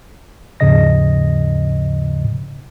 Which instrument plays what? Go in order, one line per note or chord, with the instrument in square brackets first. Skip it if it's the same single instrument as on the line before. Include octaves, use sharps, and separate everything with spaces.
[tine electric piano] D#2 G#2 C#3 F3 D#5 A#6